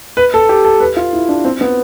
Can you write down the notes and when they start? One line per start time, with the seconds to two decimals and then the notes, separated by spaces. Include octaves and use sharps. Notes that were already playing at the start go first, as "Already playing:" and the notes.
0.17 B4
0.34 A4
0.49 G4
0.65 A4
0.80 B4
0.97 F4
1.13 E4
1.29 D4
1.45 C4
1.61 B3